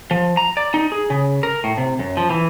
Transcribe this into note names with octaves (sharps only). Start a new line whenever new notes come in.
F3
A#5
D5
D#4
G#4
C#3
A#4
A2
C3
F#2
F3
E3